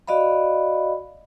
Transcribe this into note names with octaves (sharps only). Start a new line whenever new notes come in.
F#4 D5 D#5 F5 B5